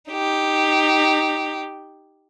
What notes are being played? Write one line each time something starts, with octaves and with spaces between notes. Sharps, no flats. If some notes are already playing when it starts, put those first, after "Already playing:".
D#4 G4